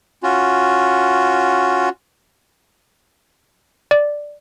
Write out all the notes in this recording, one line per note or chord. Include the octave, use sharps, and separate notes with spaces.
C#4 F4 F#4
D5